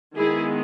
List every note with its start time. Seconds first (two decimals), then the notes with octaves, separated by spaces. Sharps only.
0.15 D#3 G#3 B3 E4 G#4